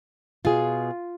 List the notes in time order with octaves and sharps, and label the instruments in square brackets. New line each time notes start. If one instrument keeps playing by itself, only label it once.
[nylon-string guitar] B2 G#4 [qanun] F4